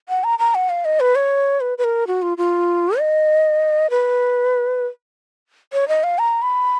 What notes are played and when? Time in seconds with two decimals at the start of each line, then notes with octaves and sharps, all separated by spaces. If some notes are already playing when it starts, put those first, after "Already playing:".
0.09 F#5
0.24 A#5
0.39 A#5
0.55 F#5
0.70 F5
0.85 D#5
1.00 B4
1.15 C#5
1.61 B4
1.78 B4
1.84 A#4
2.07 F#4
2.22 F4
2.38 F4
2.99 D#5
3.90 B4
5.73 C#5
5.88 D#5
6.04 F5
6.19 A#5
6.42 B5